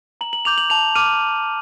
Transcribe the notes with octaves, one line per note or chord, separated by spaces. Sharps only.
A#5 F#7
F#7
D6 G6 F7
F#7
A5 F7
D6 F6 D#7